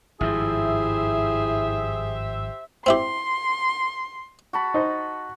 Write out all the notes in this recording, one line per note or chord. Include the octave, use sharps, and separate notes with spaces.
G#1 G2 F3 E4 G4 G#4 C5 E5
C4 E4 G4 C6
F#4 A5 B5
D#4 C5